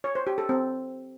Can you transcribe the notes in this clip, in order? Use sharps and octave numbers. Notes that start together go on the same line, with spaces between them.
C#5
C5
G4
A4
C4